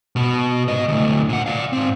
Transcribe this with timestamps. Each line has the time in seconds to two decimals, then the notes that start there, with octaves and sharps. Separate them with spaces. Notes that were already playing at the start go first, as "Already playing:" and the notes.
0.16 B2 B3
0.68 G#2 D#5
0.88 D2 A2
1.29 A#2 F#5
1.46 D5 F5
1.73 G#2 C4